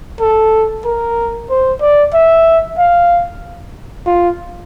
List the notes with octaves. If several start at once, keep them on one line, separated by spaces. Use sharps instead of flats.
A4
A#4
C5
D5
E5
F5
F4